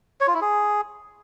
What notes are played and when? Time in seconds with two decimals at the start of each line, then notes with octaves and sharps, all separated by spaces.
0.21 C#5
0.27 F4
0.34 E4
0.41 G#4